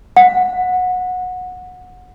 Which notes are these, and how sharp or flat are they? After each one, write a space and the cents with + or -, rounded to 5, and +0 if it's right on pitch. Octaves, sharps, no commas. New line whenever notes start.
F#5 -20